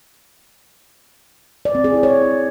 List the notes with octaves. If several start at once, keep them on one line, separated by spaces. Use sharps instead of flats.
D5
C4
G#4
E4
C#5